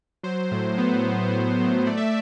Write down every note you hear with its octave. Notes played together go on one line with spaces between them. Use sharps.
F#3 C5
A2
B3
F#3
B3
F#3
A3 D5
E5